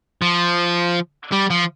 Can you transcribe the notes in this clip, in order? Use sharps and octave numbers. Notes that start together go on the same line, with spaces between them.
F3
G3
F3